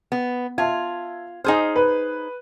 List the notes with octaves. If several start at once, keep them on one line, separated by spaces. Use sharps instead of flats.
B3
F4 E5 A5 G#6
D#4 G#4 C5 G#5 F6
B4